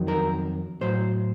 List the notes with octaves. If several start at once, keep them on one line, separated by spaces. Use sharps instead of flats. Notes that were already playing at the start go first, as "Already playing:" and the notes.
Already playing: F2 D#3 F#3
A#4
A2 F#3 C5